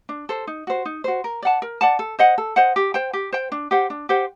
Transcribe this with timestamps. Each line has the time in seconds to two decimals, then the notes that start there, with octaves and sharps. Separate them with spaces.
0.09 D4
0.29 A4 C5
0.47 D#4
0.67 F#4 C5
0.85 D#4
1.04 F#4 C5
1.24 A#4
1.42 D5 F#5 A5
1.62 A#4
1.81 D5 F#5 A5
1.99 A4
2.19 C5 D#5 F#5
2.38 A4
2.56 C5 D#5 F#5
2.76 G4
2.94 C5 G5
3.13 G4
3.33 C5 G5
3.52 D4
3.71 G4 C5 F#5
3.90 D4
4.09 G4 C5 F#5